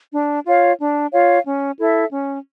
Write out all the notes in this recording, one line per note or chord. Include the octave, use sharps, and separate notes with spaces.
D4
F4 C#5 F5
D4
F4 C#5 F5
C#4
E4 A4 E5
C#4